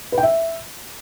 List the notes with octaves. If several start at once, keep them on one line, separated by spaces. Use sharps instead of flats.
B4
G5
E5